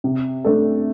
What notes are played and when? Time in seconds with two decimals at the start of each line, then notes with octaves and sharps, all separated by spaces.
0.04 C3
0.44 A3 D4 A4